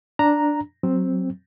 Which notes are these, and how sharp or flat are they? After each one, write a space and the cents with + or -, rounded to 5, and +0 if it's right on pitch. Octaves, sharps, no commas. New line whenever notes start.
D4 +0 A#5 +0
F#3 +0 C4 +5